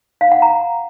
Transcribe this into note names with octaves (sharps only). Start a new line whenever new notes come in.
F5
F#5
A#5